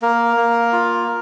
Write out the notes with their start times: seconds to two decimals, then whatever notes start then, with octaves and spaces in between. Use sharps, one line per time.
0.02 A#3 A#4
0.37 A#3
0.73 F4